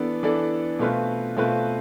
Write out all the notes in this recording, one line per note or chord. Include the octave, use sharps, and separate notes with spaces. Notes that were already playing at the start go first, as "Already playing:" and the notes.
Already playing: E3 B3 D4 A4 D5
E3 B3 D4 A4 D5
B2 A3 C4 F4 B4
B2 A3 C4 F4 B4